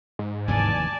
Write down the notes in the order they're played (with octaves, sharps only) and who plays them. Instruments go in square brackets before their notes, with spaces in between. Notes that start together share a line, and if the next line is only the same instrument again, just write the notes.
[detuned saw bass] G#2
[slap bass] F1 D#2 E3 [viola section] D5 G#5 A5